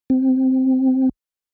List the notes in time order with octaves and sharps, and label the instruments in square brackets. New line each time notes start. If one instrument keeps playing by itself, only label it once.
[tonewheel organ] C4